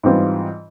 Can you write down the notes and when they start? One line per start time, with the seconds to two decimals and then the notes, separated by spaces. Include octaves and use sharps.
0.03 G#2 E3 G3 C4 F4